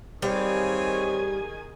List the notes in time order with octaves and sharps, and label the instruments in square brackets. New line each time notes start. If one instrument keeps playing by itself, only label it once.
[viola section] D#3 G#4 G#5 [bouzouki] G3 F5 [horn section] C4 D#4 C#5